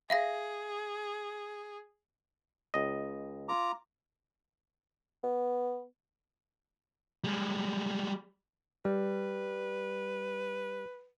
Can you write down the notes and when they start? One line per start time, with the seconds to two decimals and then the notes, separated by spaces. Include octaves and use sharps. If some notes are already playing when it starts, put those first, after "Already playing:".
0.10 G#4 E5 F5 A#6
2.74 C#2 D#5
3.49 F4 A#5 D6
5.24 B3
7.24 G3 G#3
8.85 G3 B4